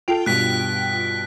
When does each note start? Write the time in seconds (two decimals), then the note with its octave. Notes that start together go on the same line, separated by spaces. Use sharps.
0.08 F4 A4 G5 D7 F7
0.26 G2 B2 F#6 B6